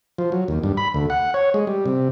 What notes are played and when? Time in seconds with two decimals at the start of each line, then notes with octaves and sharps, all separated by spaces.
0.18 F3
0.32 F#3
0.48 D#2
0.63 G2
0.77 B5
0.94 D2
1.10 F#5
1.34 C#5
1.54 G#3
1.67 G3
1.85 C3